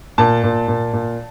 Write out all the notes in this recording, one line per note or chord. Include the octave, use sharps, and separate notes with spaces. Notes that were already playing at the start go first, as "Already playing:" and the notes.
A#2 A5
A#2
A#2
A#2